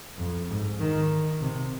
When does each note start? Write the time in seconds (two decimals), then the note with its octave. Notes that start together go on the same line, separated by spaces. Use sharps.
0.18 F2
0.49 G#2
0.79 D#3
1.41 C3